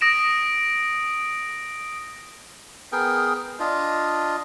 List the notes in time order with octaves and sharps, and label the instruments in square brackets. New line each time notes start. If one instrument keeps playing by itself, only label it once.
[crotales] D#6 A#6 D7 E7
[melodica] B3 G#4 A#4 G5
D4 F4 D#5